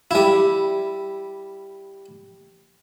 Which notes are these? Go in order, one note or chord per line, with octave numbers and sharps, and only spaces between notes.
G3 E4